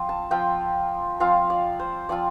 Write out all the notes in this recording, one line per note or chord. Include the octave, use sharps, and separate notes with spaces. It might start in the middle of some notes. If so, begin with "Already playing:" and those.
Already playing: F3 C4 F4
A5
F3 C4 F4 G5
F3 C4 F4 F5
D5
C5
F3 C4 F4 D5